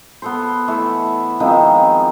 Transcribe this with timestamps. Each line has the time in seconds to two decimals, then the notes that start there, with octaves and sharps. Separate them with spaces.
0.22 B3 A4 C5
0.68 E3 A3 C#5 E5
1.40 D#3 F3 G#3 C4